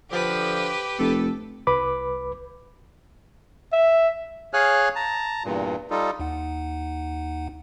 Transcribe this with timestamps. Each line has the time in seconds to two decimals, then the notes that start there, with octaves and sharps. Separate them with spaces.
0.11 D3 F3 G4 B4
0.99 F1 A4
1.67 C2 B4 B5 D6
3.72 E5
4.53 G#4 C#5 F5 G#5 F6 F#6
4.95 A5 A#5
5.44 E2 G2 A#2
5.90 G3 D#4 F4 A4
6.20 D#2 D#4 F#5